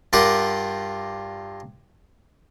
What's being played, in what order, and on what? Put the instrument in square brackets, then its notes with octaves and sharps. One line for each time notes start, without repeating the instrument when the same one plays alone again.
[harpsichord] G2 F4 G4 A#4 F#5